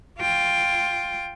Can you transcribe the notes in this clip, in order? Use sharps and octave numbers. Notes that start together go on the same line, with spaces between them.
F4 G5